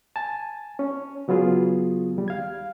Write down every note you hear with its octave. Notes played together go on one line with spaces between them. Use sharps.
G#5 A5
C#4
C#3 F#3 B3 F4 G#4
D#2 G3
F5 G#6